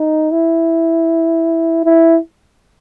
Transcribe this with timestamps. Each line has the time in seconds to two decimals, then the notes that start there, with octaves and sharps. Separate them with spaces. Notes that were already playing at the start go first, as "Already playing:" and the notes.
Already playing: D#4
0.32 E4
1.84 E4